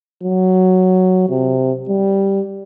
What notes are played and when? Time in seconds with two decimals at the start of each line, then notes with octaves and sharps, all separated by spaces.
0.23 F#3
1.30 C3
1.89 G3